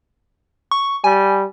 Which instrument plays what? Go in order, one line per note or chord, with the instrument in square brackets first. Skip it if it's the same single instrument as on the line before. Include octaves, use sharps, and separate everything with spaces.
[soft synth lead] C#6
[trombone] G3 [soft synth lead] G#5